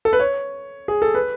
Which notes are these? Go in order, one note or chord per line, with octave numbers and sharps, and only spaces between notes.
A4
B4
C#5
G#4
A4
B4